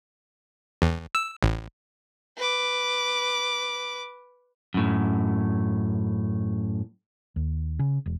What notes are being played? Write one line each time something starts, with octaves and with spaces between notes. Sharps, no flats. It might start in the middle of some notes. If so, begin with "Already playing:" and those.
E2
E6
A1
B4 D6
F#2 A2
D#2
C#3
E1